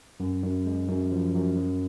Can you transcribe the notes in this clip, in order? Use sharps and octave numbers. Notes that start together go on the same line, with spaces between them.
F#2
F#2
G#3
F#2
F3
F#2
F#3